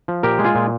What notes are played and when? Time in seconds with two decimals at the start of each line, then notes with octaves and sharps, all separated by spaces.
0.08 F3
0.23 A#2 G4 A#4
0.39 G#3
0.44 F4 G#4
0.55 A#2